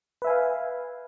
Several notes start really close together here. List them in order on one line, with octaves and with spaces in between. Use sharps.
B4 E5 G#5 F5